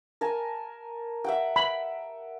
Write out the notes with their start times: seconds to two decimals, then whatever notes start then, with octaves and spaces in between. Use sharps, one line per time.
0.21 A#4 G#5 A5
1.24 E5 F#5 G5
1.56 B5